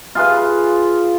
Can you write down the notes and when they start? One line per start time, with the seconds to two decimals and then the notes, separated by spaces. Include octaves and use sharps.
0.15 F4 G#4 B4